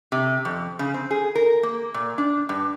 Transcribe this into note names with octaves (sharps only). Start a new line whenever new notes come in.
C3
F2
C#3
C4
G#4
A#4
A#3
A#2
D4
G2